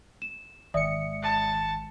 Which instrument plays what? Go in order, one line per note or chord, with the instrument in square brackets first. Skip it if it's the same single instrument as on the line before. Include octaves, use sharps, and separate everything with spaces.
[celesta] E7
[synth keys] G#1 C#7 [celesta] D5 E5 D#6
[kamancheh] A5